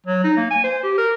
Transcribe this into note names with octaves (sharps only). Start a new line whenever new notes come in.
F#3
D#4
A#3
G#5
C5
G4
A#4